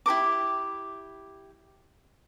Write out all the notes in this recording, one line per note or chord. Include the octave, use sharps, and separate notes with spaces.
E4 G4 A#4 D6